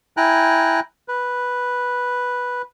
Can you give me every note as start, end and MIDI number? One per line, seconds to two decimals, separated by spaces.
0.17 0.80 64
0.17 0.80 79
0.17 0.80 80
0.17 0.80 82
0.17 0.80 90
1.08 2.62 71